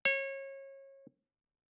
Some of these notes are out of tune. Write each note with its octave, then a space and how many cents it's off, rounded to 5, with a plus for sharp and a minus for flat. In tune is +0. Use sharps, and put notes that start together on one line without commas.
C#5 -30